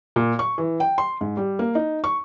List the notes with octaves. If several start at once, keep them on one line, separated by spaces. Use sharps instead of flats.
A#2
C#6
E3
G5
C6
G#2
G3
A#3
D#4
C#6